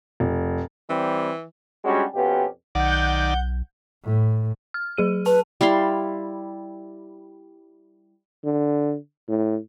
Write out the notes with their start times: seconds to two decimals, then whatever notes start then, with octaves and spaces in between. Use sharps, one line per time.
0.20 F1
0.90 E3 G3 C4
1.84 G3 G#3 C#4 D4 F#4 G4
2.14 F2 B2 B3 C#4 G4
2.75 B1 D#3 D5 F#5 G6
4.04 A2
4.74 F6
4.98 F#3 G#4 D#7
5.26 B4 A5
5.61 G3 E4 F5 C6
8.44 D3
9.28 A2